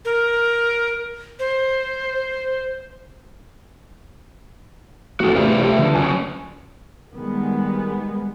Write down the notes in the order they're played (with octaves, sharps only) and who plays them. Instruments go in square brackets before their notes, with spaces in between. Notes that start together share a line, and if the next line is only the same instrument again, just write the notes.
[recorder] A#4
C5
[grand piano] G#1 E2 [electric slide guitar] F#4 A4
[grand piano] A2 C3 B3 [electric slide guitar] F4 D5 E5
[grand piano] C3 A3 G4
D3 B3
[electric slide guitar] F#2 C#3 [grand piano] G#5
[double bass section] D#3 G3 G#3 B3